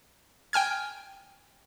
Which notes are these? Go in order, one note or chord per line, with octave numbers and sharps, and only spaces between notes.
G5 G#5 F6 G#6